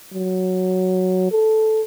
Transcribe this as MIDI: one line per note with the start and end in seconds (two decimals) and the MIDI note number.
0.13 1.29 54
1.31 1.82 69